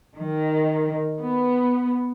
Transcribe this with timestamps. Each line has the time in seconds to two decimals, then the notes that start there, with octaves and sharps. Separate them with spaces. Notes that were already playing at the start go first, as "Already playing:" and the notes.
0.18 D#3
1.20 B3